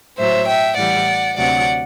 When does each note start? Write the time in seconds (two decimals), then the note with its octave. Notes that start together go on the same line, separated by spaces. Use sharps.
0.18 A2 F#3 C5 E5
0.48 E5 G5
0.77 A2 E3 G3 D5 F#5
1.37 D2 C3 F#3 D5 F#5